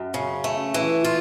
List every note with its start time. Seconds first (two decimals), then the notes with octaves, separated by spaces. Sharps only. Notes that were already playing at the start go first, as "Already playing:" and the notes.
Already playing: F#2
0.14 C#3
0.44 A3
0.74 E3
1.04 F4